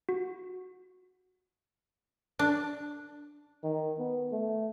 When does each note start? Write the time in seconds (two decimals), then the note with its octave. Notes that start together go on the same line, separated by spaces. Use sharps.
0.09 F#4
2.39 D4
3.64 D#3
3.99 B3
4.32 A3